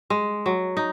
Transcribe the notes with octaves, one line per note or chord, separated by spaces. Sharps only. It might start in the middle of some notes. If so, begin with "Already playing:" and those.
G#3
F#3
D#4